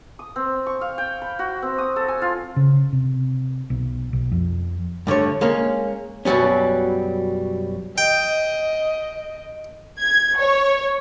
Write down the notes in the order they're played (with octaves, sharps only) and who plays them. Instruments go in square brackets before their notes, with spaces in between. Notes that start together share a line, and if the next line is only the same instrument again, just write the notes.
[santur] D#6
C4
C#6
F5
G5
B5
F#4
C4
D#6
A4
G#5
F4
[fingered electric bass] C#3
C3
B1
B1
F2
[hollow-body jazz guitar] G2 D3 A3 C#5
G#3 A#3 C#4
F#2 B2 F#3 G3 C#4
[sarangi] D#5 [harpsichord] G5
[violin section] G#6
C#5